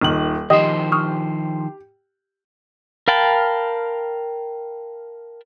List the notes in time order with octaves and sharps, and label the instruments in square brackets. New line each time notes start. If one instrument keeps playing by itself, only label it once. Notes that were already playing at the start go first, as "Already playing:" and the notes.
[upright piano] D#1 D#3 F#7
[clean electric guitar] D#3 F3 C5 [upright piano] G4 [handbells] D#5 D#6
[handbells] C#6 D#6 F6
[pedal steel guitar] A#4 F5 G5 A5 B5